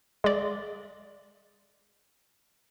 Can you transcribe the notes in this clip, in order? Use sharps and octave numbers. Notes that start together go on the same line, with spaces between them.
G#3 D5